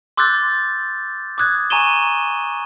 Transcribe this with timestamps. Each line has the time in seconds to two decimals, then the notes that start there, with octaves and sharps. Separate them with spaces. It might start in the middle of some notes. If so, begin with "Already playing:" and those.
0.17 C6 D6 E6 F#6 G6 A6
1.38 D6 D#6 F#6 G#6
1.70 G#5 A#5 C#6 D#7 E7 G7